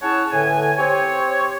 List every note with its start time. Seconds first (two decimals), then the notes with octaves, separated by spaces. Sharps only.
0.02 C#4 E4 G#4 C#5 F#5 A5
0.33 A2 D3 B4 G#5
0.79 C4 G4 C5 C#5